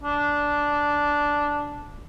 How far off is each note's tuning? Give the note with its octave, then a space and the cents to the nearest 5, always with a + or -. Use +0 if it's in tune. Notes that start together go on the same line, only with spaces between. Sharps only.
D4 -5